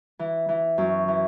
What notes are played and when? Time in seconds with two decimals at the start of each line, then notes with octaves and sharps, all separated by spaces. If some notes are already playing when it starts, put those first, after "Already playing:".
0.19 E3
0.49 E3
0.78 F#2
1.08 E3